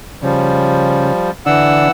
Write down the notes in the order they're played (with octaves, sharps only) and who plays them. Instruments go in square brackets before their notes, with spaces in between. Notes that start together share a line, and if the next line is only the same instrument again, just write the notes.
[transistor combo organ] C#3 [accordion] F3 G3
[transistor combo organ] D3 D4 [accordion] E3 F#5 E6